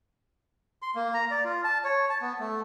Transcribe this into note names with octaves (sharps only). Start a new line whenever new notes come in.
C6
A#3
A#5
D5
F4
A5
C#5
A5
B3
A3